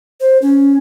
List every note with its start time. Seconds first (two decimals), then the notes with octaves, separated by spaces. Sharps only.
0.20 C5
0.42 C#4